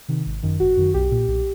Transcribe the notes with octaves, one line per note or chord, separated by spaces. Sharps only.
C3 D#3
G#1
F#2 D#3
G#1 F#4
F#2 D#3
B1 G4
A#2
B1